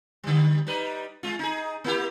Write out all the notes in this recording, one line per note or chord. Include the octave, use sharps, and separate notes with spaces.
D3 G3
G3 D#4 B4
G#3 F4
D#4 G#4
A#3 E4 G4